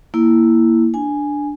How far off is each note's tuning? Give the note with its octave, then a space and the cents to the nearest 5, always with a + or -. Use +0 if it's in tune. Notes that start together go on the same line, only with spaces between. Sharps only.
A#3 +0 E4 +0
D4 +0 G#5 +0